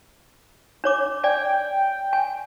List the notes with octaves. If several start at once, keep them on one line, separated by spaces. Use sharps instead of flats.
D4 C#5 D6
D5 G5 G#5
G#5